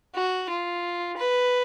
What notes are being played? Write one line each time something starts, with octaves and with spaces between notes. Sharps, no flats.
F#4
F4
B4